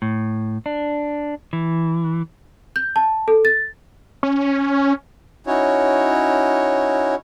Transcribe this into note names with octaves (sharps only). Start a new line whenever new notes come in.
A2
D4
E3
G6
A5
A4
A6
C#4
C#4 D#4 E4 F#4 C#5